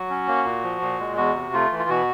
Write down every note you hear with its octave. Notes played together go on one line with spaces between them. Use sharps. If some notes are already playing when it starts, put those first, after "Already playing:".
Already playing: F#3 F#4
C#4
A#3
A#2
F3
A#2
G#3
E2 F#4
C3
A3 F4
E3
F4
B2 F#4